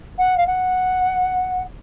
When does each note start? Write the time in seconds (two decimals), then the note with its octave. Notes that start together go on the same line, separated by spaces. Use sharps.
0.18 F#5
0.37 F5
0.47 F#5